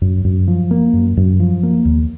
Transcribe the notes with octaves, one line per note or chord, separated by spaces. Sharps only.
F#2
F#2
F3
A#3
F#2
F#2
F3
A#3
D#2